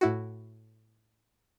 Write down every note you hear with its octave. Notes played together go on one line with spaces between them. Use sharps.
A2 E4 F#4